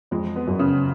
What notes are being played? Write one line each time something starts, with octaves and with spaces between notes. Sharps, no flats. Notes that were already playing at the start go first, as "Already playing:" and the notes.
F2 G#3
B3
F#2
C#3